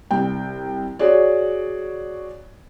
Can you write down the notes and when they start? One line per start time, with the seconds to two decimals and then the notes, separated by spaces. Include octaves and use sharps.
0.11 C2 G5
0.99 F#4 G#4 C#5 D5